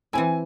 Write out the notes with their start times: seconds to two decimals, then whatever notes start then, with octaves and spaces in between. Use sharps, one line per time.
0.13 E3 C4 E4 G#5